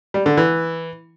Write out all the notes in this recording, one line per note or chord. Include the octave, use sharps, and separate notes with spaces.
G3
D3
E3